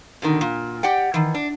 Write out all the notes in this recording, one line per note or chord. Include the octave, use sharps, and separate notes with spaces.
B2 D3 D#3
A#2
G4 D5 F#5 G5
D#3 E3
D4